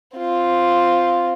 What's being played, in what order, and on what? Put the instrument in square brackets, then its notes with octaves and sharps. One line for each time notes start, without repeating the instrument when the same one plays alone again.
[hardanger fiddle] C4 F4